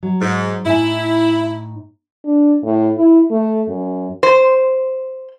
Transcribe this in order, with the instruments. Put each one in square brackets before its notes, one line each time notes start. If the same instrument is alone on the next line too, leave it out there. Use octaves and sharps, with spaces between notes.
[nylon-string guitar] F#3
[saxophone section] G#2
[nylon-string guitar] A2 D#4 G#5 [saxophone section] E4
[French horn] D4
A2
E4
A3
F#2
[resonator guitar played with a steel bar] C5